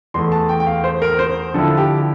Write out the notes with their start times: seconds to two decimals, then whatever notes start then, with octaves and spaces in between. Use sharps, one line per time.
0.14 E2 E3 A3 C6
0.32 A5
0.49 G5
0.60 G5
0.67 F5
0.84 C5
1.02 A#4
1.19 C5
1.54 D3 F3 C4 E4 A4
1.77 G4